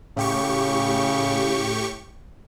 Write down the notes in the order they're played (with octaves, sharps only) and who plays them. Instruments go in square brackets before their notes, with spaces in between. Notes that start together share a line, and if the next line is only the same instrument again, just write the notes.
[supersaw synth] A2 G4 C#6 [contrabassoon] C#3